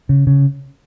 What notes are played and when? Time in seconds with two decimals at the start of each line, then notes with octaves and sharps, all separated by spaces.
0.09 C#3
0.27 C#3